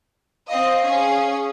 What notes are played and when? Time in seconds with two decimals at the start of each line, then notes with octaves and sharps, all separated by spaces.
0.49 C4 D#5 F5
0.83 C#4 G#4